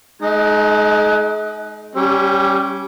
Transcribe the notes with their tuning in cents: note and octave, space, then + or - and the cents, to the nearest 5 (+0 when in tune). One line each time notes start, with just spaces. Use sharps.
G#3 +40 D#4 +0
G3 -15 C#4 +0 G4 +25